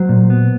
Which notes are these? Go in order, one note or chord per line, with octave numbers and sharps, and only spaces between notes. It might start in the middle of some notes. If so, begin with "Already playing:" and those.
Already playing: F#3 C5
A#2
B3